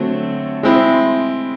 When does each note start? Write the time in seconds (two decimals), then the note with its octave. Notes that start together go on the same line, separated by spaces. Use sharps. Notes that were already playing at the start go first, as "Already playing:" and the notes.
Already playing: D3 F#3 A3 C4
0.63 G#3 C4 E4